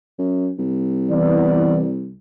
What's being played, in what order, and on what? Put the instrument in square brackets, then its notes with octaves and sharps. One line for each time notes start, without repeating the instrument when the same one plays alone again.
[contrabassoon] F#2
C2
[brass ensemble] E3 B3 D5